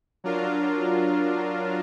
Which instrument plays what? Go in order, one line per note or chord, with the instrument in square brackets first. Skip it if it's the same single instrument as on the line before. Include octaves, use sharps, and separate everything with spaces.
[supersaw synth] F#3 D4 F4 A#4